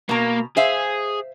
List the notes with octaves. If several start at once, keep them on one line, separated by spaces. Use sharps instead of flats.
B2 A#3 A#5
G#4 C5 E5 F5